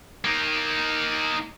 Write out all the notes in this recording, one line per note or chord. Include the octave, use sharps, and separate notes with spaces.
A#3 D#4